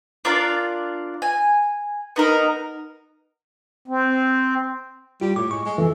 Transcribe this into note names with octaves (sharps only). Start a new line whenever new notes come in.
D4 F4 A#4 D5
G#5
B3 D#4 A#4
C4
G3 F4
A2 D6
G#3 C#6
G#3
F2 E3 A4